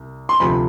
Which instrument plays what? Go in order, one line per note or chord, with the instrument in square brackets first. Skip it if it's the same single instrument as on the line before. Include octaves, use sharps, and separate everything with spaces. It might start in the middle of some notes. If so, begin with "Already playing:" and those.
Already playing: [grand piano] C2
C6
D2 C3 F3 B5